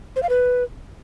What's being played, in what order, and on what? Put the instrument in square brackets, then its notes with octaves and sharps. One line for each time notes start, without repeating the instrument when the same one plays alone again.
[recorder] C5
F5
B4